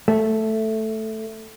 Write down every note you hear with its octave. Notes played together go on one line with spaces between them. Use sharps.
A3